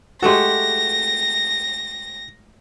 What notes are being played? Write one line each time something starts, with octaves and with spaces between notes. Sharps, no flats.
G#3 A3 F#4 G4 A4 A#6